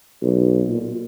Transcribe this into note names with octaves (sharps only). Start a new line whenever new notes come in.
B1
A#2